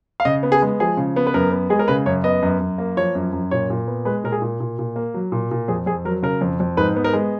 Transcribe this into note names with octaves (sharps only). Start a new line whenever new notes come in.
F5
C#3 D#5
B3
G#4
G#3
F3 G#4
C#3
B3
B4
F#2 A#4
B3
G#3 G#4
A#4
C#3 B4
F#2 C#5
B3 D#5
F#2
F#2
A#3
F3 C#5
F#2
F#2
A#2 C#5
A#2
B3
G#3 B4
A#2 A#4
G#4
A#2
A#2
A#2
A#3
F#3
A#2
A#2
F2 G#4
F2 G#4
F#3 A#4
C#3 A#4
F2
F2
G#2 B4
B3
A#4
G#3